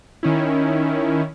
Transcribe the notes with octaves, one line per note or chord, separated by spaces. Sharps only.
D#3 C#4 E4